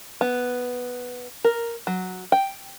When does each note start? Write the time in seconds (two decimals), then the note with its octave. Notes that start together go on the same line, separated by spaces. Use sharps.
0.21 B3
1.44 A#4
1.87 F#3
2.32 G5